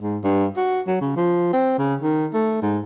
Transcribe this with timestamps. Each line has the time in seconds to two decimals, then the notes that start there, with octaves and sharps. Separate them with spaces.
0.01 G#2
0.24 G2
0.57 F#4
0.87 F#3
1.01 C#3
1.16 F3
1.53 C4
1.78 C#3
2.02 D#3
2.34 A3
2.62 G#2